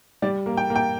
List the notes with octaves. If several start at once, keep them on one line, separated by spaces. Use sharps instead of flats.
G3 D5
A#3
G5
A#3
G5